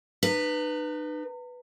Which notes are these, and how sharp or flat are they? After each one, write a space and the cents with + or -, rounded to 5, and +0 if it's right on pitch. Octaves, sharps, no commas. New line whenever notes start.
D#4 -40 B4 +0